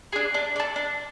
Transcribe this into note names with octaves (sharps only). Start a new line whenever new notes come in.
D4 G#4
D4
A4 D5
D4